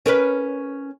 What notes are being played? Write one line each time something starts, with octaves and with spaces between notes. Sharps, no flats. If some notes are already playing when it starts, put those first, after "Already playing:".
C#4 A#4 B4